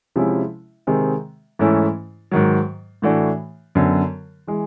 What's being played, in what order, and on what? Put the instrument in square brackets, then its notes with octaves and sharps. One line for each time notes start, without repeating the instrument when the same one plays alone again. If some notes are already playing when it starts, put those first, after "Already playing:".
[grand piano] C3 F3 G#3 C#4 E4
C3 D#3 G#3 C4
G#2 E3 A3 C#4 E4
G#2 D#3 F#3
A2 E3 A3 D4 F#4
F#2 D3 F#3 B3
E3 G#3